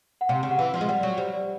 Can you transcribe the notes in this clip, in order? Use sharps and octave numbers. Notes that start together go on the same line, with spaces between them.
F#5
C3 F5
C#3
F#5
E3 F5
F3
G#3
G3 F#5
D5
F#3 C#5
G3 C5
D5